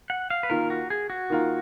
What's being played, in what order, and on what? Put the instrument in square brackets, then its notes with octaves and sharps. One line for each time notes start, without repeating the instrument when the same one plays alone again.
[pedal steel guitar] F#5
F5
B4
[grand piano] D#3 A#3 F4 [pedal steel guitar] A#4
[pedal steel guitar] F#4
G#4
F#4
[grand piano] D#3 A#3 F4 A#4